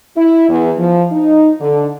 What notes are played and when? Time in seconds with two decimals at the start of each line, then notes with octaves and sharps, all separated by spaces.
0.16 E4
0.49 E2
0.78 F3
1.11 D#4
1.60 D3